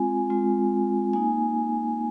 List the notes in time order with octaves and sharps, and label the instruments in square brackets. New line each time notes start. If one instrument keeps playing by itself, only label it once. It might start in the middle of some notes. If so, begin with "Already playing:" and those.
Already playing: [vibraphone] G#3 C4 F4 G#5
G#3 C4 F4
A#3 D#4 G#5